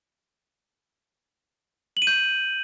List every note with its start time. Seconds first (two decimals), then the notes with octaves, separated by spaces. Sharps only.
1.97 F#7
2.02 D#7
2.07 G6